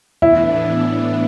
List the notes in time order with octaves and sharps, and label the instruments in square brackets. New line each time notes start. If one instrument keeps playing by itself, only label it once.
[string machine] A2 E3 B3 D4 [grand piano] E4